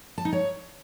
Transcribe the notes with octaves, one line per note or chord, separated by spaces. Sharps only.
A5
D#4
C#5